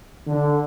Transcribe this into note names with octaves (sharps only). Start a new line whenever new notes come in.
D3